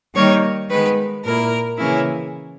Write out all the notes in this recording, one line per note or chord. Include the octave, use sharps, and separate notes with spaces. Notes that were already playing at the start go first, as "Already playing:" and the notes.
D#3 G3 A#3 D#4 C#5
D#3 G#3 B3 B4
A#2 A#3 E4 A#4
C#3 E3 A#3 C#4 E4